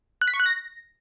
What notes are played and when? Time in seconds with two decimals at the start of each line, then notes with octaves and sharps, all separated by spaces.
0.22 F#6
0.28 B6
0.34 C#6
0.40 F#6
0.46 A#6